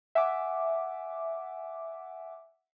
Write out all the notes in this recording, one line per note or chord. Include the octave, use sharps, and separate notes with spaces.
E5 F#5 G#5 D6